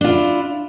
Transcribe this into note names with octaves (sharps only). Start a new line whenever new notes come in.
D4 E4 F4